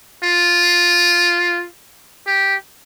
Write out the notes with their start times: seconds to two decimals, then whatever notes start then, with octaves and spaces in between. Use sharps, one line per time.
0.23 F4
2.26 G4